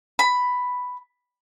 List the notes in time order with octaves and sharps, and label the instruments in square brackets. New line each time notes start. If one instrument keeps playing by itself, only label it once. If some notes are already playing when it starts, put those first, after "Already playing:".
[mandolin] B5